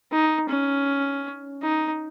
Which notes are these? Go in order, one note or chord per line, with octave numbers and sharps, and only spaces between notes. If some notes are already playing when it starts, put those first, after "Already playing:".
D#4
C#4
D#4